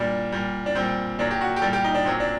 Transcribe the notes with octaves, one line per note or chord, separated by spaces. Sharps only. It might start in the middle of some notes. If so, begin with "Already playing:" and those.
Already playing: A#2 G3 D4
A#2 G3
D4
A#2 G3 C4
A#2 F#3 D4
G4
F#4
G4
A#2 G3 A4
G4
D#4
D4
A#2 F#3 C4
D4